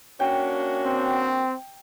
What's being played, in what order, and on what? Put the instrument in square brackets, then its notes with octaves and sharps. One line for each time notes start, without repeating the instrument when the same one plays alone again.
[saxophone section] A#3 D4 F#4 [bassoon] C#4 [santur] G5
[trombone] C4